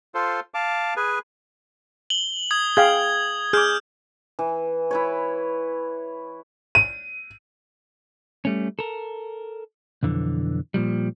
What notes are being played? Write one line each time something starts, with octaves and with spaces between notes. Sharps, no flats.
F4 A4 C5
F5 A5 D6
G#4 B4 G#5
F#7 G7
D#6 G#6
G#4 F5 G5 G#6
G#4 D6 F6 G6
E3
E4 B4 C#5
D#7
G3 A3 C#4
A4 A#4
B1 F2 D3 E3
A#2 F3 G3